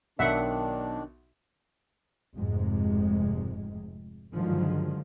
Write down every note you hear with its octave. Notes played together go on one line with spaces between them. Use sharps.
B1 D#3 D4 E5 F#5
F1 F2 G#2 C3 G#3
G2 D3 D#3 F3 F#3 G#3